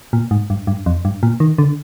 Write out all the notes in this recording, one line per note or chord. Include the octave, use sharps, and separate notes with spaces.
A#2
G#2
G2
G2
F2
G2
A#2
D#3
D3